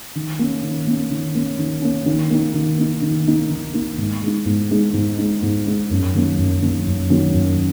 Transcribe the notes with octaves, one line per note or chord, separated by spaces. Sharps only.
D#3
A#3 C#4
D#3
A#3 C#4
D#3
A#3 C#4
D#3
A#3 C#4
D#3
A#3 D#4
D#3
A#3 D#4
D#3
A#3 D#4
D#3
A#3 D#4
G#2
G#3 D#4
G#2
G#3 D#4
G#2
G#3 D#4
G#2
G#3 D#4
F#2
D#3 F#3 A#3 C#4
F#2
D#3 F#3 A#3 C#4
F#2
D#3 F#3 A#3 C#4
F#2